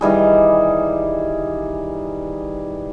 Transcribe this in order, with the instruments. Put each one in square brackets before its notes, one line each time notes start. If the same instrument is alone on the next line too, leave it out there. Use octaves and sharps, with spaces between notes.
[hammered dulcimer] D#3 E3 G3 G#4